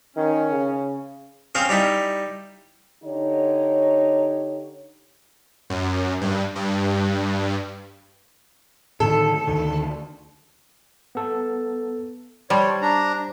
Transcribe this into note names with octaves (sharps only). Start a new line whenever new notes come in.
D#3 C#4
C#3
C4 C#4 G#4 C5 F5
G3 D#4 E4
D3 D#4 G4 C#5
F#2
G2
G2
A2 D3 D#3 A4
D2 D3 D#3
B3 A4
G3 C5 C#5 A5 C6
D4 A#5